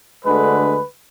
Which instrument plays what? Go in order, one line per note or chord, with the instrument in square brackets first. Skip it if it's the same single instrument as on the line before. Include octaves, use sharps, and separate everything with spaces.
[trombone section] D2 D3 G#3 B4